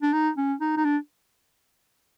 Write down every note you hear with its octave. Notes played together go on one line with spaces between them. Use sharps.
D4
D#4
C#4
D#4
D#4
D4